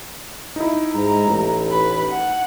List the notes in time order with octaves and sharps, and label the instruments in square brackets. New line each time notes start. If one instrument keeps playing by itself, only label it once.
[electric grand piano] D#4 E4
[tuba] G#2 [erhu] A#5
[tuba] A1
[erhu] B4
F#5